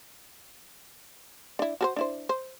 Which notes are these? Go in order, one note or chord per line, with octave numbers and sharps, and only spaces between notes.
D4 E4
F#4 A4 C5
D4 E4 C5
C5